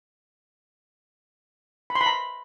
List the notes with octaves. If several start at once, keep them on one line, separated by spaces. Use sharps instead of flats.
B5
C6
B5
A#5